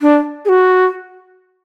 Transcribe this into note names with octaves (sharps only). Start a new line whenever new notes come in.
D4
G#4
F#4